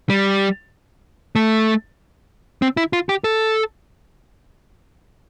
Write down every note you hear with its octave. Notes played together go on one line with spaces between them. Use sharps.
G3
A3
C4
E4
F4
G4
A4